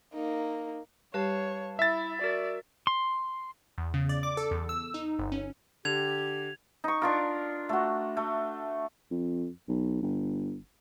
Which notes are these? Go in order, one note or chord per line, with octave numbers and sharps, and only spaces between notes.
A#3 D#4
G3 G4 B4 C#5 F5 A5
E4 E5 A6
F#4 A#4 D5
C6
E2
C#3
D5
D6
A4
E2
E6
D#4
G1
C#4
D3 G4 G#6 F7
D#4 C#6
D4 F4 A#4
A3 F#4
A3
F2
B1
G1